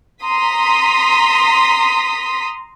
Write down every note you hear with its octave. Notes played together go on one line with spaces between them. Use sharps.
A#5 C6 D#6 B6